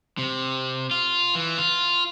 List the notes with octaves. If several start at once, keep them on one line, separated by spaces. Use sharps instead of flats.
C3
F4
E3
F4